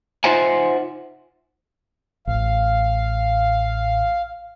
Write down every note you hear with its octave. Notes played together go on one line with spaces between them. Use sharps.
D#4 F4 C5 E5 F#5 G#5
A1 F5